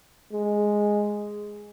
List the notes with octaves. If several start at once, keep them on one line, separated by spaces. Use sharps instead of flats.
G#3